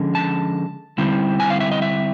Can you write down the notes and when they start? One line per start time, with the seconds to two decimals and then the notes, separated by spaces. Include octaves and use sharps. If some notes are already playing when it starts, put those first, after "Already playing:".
Already playing: D3 F3 G#3 C#4
0.15 A5
0.98 D3 G3 C4 E4
1.40 G#5
1.50 F5
1.60 E5
1.72 D#5
1.82 E5